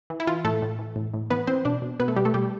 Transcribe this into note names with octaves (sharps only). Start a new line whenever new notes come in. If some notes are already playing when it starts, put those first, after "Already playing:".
E3
E4
E3 F4
A2 A3 A4
A2
E3
A2
A2
E3 B3 B4
E3 C4 C5
B2 D4 D5
B2
B2 B3 B4
A3 A4
B2 G3 G4
A3 A4
B2 G3 G4